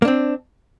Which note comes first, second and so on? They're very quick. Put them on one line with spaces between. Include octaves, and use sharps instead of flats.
A#3 D4 C4